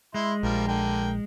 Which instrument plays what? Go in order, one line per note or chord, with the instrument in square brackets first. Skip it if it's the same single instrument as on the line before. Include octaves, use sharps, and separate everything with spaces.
[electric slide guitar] G#3 [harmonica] E4 C6
[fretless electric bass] A#1 [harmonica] F3 G3 A#4
[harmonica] D3 A#4 G5